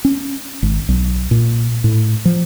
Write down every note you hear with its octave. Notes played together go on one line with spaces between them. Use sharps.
C#4
G#1
B1
A#2
A2
F3